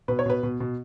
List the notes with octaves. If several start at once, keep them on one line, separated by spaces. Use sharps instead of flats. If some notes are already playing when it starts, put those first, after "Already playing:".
B2 B4
C#5
B2 B4
B2
B2